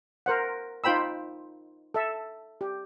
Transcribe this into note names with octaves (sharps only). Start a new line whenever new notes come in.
A#4 C5 F#5
D#4 F4 C5 G5 B5 E6
A4 E5
G4